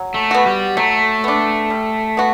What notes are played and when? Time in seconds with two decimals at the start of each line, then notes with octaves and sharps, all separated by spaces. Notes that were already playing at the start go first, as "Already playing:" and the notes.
Already playing: F#3
0.14 A3
0.31 B3 F#4
0.46 G3
0.77 F#3 A3
1.24 B3 D4
1.70 G3
2.17 B3 F#4